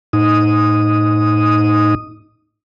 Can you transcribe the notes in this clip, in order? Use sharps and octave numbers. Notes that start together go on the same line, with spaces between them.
A2 D#4 D#6